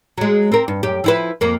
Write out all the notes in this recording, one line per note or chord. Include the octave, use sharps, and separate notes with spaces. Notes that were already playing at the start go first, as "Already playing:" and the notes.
F#3 G#3
C4 A#4
G2
F#2 G4
F3 E4 B4
F2 A#3